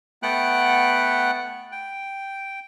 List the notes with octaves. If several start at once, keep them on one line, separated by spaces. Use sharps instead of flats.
A3 B3 F#5 G5 F#6
G5